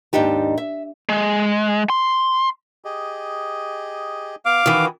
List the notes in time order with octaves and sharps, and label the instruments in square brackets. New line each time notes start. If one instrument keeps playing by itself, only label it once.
[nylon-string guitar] D#2 G#2 D4 D#4 G4 A5
E5
[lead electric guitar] G#3
C6
[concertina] G4 G#4 D#5
[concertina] B3 F6 [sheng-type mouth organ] F5 D6
[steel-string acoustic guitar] D#3 E3 [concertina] F#4